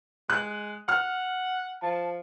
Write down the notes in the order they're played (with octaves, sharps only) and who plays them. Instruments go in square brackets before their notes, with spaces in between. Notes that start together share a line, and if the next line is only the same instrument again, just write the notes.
[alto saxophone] G#3 [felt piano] F#6
[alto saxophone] F#5 [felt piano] F6
[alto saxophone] F3 [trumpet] A5